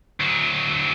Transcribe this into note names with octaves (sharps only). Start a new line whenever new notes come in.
D2 F#3